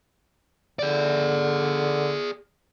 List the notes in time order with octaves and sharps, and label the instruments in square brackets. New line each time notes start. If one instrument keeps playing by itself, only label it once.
[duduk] D3 [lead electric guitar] G#4 D5